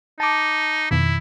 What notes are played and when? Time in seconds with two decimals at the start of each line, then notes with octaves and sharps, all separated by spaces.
0.20 D#4 A5 D6
0.91 F2 B2 D#3 E4